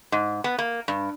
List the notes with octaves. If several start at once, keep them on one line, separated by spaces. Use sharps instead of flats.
G#2
B3
A#3
G2